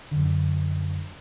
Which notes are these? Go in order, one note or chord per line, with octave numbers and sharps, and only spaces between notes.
F#2 D3